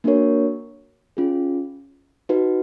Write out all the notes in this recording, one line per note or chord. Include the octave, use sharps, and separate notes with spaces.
A#3 D4 F#4 A#4 C#5
C#4 F4 G#4
D#4 F#4 B4